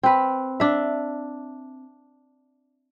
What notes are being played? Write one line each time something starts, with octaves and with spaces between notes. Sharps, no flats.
C4 B4
D4 E5